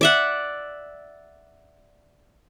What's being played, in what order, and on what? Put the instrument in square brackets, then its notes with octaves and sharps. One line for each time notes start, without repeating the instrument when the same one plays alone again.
[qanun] D5 E5 F#5